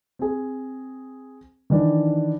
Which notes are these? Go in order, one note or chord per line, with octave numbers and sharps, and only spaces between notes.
C4 G#4
D#3 E3 D4